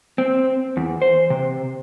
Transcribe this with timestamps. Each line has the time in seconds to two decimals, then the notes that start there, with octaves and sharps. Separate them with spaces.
0.18 C4
0.77 E2
1.02 C5
1.30 C3